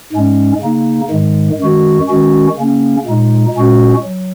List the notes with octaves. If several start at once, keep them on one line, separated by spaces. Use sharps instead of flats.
G#2 G#3 C#4
C#3 A#3 D#4
G#2 D#3 G#3
F#2 D#3 G#3 F#4
D#3 G#3 C#4 F#4
C#3 A#3 C#4
A#2 G#3 D#4
A#2 G#3 C#4 F#4
F#3